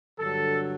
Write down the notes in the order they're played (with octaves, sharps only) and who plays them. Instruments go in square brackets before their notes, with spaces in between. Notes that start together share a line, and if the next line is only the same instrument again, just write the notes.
[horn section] G2 D3 F#3 A4